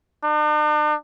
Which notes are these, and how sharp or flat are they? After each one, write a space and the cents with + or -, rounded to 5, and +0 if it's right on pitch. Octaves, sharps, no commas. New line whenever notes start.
D4 +45